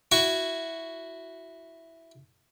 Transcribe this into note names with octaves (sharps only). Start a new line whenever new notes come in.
E4 F#4 C#6